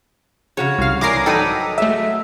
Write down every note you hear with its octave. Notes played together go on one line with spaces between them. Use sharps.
C#3 F#4 G#4 C#5
C2 F5
E3 G#4 A#4 D5 D6 A#6 C7
G#2 F#3 D#4 A4 B4 D5 G5 D#6
F#3 G#3 A3 E5